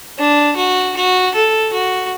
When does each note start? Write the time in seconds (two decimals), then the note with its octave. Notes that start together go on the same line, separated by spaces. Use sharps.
0.19 D4
0.57 F#4
0.96 F#4
1.35 A4
1.73 F#4